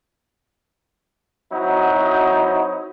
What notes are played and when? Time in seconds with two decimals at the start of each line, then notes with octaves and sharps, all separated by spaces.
1.53 F#3 C4 D#4 E4 F#4